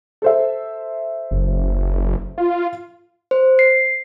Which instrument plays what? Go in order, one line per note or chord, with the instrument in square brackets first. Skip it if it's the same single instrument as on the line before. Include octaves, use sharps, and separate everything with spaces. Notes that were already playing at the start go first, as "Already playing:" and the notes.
[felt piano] A4 C5 E5
[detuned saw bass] F#1
F4
[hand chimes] C5
C7